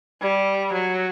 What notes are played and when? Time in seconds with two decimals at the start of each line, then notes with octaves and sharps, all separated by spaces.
0.21 G3
0.73 F#3